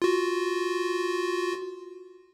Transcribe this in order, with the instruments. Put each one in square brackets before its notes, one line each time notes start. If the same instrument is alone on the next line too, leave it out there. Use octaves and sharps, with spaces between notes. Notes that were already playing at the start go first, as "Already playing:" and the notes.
[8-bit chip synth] F4 F#4